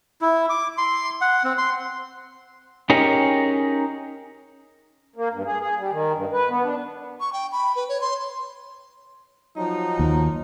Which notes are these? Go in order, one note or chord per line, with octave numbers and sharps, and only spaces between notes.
E4
D6
C6
F#5
C4
C6
C#4 D#4 G4 G#4 A#4 C#5
A#3
G2
G#4
G#4
G3
D#3
G2
B4
B3
D4
C#6
G5
B5
B4
C#5
C6
F3 F#3 D#4
D#2